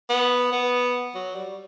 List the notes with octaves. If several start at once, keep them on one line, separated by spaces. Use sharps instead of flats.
B3
B3
F#3
G3